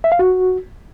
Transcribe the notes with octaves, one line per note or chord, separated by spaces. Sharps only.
E5
F5
F#4